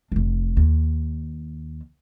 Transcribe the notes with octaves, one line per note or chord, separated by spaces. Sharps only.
F1 D4
D#2